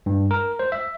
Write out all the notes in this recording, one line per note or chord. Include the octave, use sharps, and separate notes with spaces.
G2
A#4
C5
E5